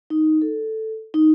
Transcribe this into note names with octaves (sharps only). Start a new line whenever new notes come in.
D#4
A4
D#4